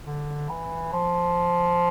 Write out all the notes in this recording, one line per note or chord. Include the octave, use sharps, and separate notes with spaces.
D3
E3
F3